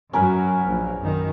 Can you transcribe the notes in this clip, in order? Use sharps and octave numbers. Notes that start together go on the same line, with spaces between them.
F#2 F#3 C#4 A#4 B4
A#1
F#2 D#3